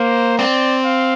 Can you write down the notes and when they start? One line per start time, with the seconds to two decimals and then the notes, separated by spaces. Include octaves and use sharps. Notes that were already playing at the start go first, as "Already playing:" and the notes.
Already playing: A#3 C5
0.39 C4 D5
0.85 F5